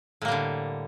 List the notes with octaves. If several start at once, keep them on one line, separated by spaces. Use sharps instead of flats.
A2 D3 G3 A#3